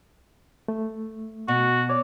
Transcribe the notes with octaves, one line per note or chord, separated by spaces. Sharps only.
A3
B2 F#4
C#5 D5